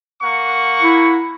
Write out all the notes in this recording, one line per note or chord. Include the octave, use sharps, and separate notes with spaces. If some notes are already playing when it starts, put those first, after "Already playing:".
A#3 F#5 C#6
E4